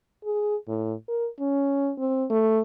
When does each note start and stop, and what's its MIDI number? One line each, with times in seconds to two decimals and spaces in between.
0.25 0.56 68
0.68 0.94 45
1.09 1.28 70
1.40 1.92 61
1.99 2.25 60
2.30 2.61 57